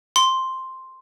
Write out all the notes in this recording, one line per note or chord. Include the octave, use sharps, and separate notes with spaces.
C6